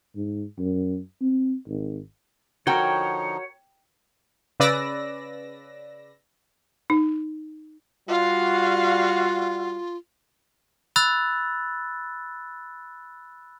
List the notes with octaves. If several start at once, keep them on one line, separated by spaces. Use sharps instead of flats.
G#2
F#2
C4
G#1
D3 F3 D#4 F#4 A#4 C#5 G5
C#3 B4 D5 E6 A#6
D#4
G3 F4 F#4 F5
B5 E6 F#6 A6